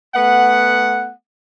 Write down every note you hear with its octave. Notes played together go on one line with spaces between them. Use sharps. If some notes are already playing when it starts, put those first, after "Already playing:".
A3 B3 F#5